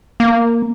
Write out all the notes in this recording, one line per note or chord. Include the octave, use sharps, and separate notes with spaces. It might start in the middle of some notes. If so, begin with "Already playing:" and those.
A#3